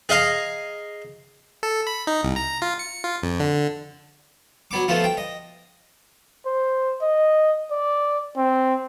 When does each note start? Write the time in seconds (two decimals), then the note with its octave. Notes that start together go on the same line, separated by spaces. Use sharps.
0.09 G#4 D#5 F5 A#5
1.63 A4
1.87 B5
2.07 D#4
2.23 C2
2.36 A#5
2.62 F4
2.79 C#7
3.04 F4
3.23 F2
3.40 D3
4.71 F#3 B3 D6
4.88 F3 A3 B3 F4
5.04 G5
5.17 D#5
6.46 C5
7.01 D#5
7.71 D5
8.37 C4